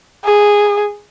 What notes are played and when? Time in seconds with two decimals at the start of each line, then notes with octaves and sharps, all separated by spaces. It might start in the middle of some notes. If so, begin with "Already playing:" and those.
0.25 G#4